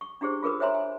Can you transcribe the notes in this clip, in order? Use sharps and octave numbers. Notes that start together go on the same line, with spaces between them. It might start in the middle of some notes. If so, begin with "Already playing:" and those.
C#6
D4 E4 G4 G#4 C5
F4 G#4 A#4 B4 D#6
C5 C#5 E5 G#5 A#5 C6
G#5